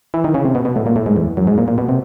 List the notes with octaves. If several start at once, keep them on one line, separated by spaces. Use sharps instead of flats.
E3
D#3
C#3
C3
B2
B2
A2
A#2
A2
G#2
E2
F#2
G#2
A#2
A#2
B2
C3